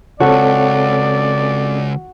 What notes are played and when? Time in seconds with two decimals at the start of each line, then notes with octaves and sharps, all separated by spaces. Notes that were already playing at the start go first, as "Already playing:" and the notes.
0.20 C#2 C4 F#4 A4 C#5 D5